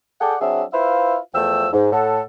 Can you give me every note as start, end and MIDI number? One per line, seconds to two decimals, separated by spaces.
0.21 0.35 68
0.21 0.35 69
0.21 0.35 74
0.21 0.35 78
0.21 0.35 79
0.41 0.63 54
0.41 0.63 60
0.41 0.63 62
0.41 0.63 68
0.41 0.63 76
0.73 1.18 64
0.73 1.18 65
0.73 1.18 71
0.73 1.18 72
0.73 1.18 76
0.73 1.18 77
1.34 1.67 40
1.34 1.67 53
1.34 1.67 57
1.34 1.67 79
1.34 1.67 88
1.73 1.88 44
1.92 2.21 45
1.92 2.21 69
1.92 2.21 78